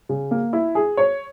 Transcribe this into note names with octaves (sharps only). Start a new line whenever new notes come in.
C#3
A#3
E4
G#4
C#5